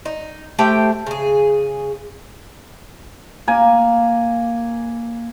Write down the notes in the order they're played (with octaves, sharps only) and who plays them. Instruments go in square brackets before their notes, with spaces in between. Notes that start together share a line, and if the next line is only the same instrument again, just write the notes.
[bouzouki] D#4
A3 G4 C5 G5
C#3 G#4
[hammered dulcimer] A#3 G#5